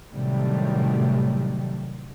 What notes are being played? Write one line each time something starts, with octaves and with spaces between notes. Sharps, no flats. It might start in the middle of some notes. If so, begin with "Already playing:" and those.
A2 C3 D#3 F#3 G3 A3